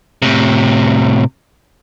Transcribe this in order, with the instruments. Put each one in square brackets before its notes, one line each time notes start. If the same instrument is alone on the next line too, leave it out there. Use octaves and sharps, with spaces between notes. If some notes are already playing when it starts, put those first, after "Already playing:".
[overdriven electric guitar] A2 C3